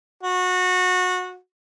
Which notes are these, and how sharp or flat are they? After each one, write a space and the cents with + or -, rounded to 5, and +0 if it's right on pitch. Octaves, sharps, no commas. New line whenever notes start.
F#4 -20